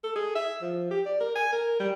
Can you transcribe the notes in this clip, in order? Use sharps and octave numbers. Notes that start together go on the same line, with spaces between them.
A4
G#4
E5
F3
G4
D5
A#4
G#5
A#4
G3